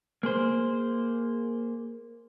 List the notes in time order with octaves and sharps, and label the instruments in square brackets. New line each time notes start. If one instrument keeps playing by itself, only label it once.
[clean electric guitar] A#3 G#4 C5